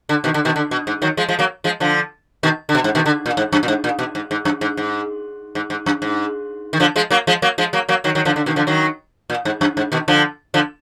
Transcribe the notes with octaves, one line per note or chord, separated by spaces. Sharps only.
D3
B2 D#3
D3
B2 D#3
D3
B2
G#2
D#3 F#3
F3 G#3
F3 G#3
F#3 A#3
F3 G#3
D3 F3
B2 D#3
D3
B2
G#2
B2 D#3
D3
A#2
G#2
F#2
A#2
G#2
A#2
B2
G#2
G#2
F#2
G#2
G#2
G#2
G#2
F#2
G#2
D#3
D3 F3
F3 G#3
F#3 A#3
F3 G#3
F#3 A#3
F3 G#3
F#3 A#3
F#3 A#3
D#3 F#3
D#3 F#3
D3 F3
D3
B2 D#3
D3 F3
D#3 F#3
A#2
G#2
F#2
G#2
B2 D#3
D3 F3
D3 F3